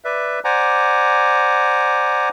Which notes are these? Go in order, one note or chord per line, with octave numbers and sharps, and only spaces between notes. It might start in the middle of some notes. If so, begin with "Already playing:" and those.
B4 D5 E5
C5 D5 F#5 G#5 A#5 D6